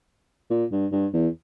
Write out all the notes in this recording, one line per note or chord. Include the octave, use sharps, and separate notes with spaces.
A#2
G2
G2
E2